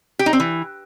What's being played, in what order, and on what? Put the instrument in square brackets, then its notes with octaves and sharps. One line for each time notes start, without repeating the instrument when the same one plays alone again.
[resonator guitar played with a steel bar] G4
D#4
C4
E3